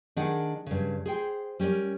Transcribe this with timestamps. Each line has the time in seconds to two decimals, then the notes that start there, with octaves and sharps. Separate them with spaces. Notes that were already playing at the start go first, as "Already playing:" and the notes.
0.16 D#3 D4 G#4 F#5
0.66 G2 C#3
1.05 G#4 C5 G5
1.60 G3 C#4 A#4 D5